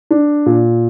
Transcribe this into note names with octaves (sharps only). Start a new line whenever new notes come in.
D4
A#2